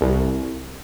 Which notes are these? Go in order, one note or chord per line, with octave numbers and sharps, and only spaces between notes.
C2